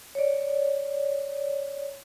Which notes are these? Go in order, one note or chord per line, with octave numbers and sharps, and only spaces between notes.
C#5 D5